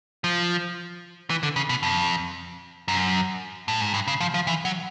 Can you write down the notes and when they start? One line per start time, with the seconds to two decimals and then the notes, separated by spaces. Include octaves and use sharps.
0.24 F3
1.30 E3
1.43 D3
1.56 C#3
1.69 B2
1.83 F2
2.88 F#2
3.68 A2
3.81 G#2
3.94 G2
4.08 C#3
4.20 F3
4.34 F3
4.47 E3
4.65 F#3